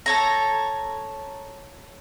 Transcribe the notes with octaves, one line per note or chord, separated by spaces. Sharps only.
A4 C#5 A#5